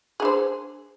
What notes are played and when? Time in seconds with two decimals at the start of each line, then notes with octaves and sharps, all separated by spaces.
0.20 G#4
0.22 D4
0.25 C5